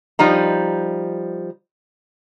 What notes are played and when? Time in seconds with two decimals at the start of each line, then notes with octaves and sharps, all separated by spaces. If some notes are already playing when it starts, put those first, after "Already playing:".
0.19 F3 G3 D#4 A#5